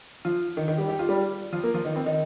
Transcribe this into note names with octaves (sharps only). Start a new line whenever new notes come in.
F3 F4
D#3 D#4
D#3 D#4
G3 G4
G4
F4
G3 G4
F3 F4
A#3 A#4
F3 F4
D#3 D#4
C4
D#3 D#4